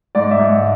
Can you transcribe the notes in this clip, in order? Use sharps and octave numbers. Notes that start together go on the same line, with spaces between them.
G#2 D5
E5
G#2